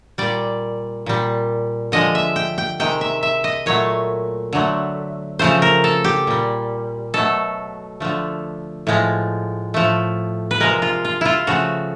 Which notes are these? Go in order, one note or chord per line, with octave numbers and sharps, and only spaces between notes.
A#2 G3 D5
A#2 G3
D3 F3 G#3 D#5
E5
G5
G5
C3 D#3 G#3 G5
E5
E5
D#5
A#2 F#3 A3 C#5
D3 F#3 A3
C#3 F3 A3 C5
A#4
A4
G4
A#2 G3
B2 F#3 A3 A4
D3 F3 A3
A2 F3 G#3
A2 F3 A3
B4
C3 F3 G#3 A#4
F4
F4
E4 F4
C#3 F3 A3 F#4